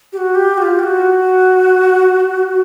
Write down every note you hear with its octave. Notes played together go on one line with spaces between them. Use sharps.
G4
F#4
G4
F#4
F4
G4
F#4